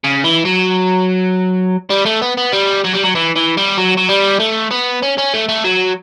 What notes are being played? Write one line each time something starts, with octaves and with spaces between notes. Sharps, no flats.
C#3
E3
F#3
G3
A3
B3
B3
G3
F#3
G3
F#3
E3
E3
G3
F#3
F#3
G3
A3
B3
C#4
C#4
A3
A3
F#3